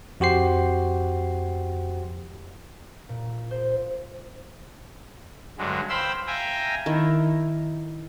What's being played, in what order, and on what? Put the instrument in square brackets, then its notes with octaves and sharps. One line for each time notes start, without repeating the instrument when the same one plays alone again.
[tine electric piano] F2 F#4 G4 C5 C7
[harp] A#2
C5
[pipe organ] G2 D3 F#3 G#3
C5 F5 G5 B5 C6 E6
E5 F5 G5 G#5 A#5
[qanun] D#3 E4